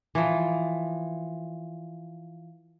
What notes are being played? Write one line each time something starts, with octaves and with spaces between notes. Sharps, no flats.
E3 F3